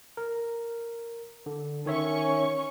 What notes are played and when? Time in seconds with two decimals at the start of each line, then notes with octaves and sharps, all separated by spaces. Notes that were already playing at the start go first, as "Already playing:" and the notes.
0.17 A#4
1.46 D3
1.86 D#3 C#4 C#5 E5 C#6